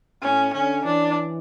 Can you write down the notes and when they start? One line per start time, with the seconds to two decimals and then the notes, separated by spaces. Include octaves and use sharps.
0.22 A2 C#4
0.53 D3 C#4
0.84 E3 D4